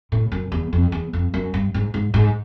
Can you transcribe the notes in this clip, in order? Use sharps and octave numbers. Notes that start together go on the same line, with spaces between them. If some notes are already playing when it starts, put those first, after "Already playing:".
A2
F#2
E2
F2
E2
F2
F#2
G2
G#2
G#2
G#2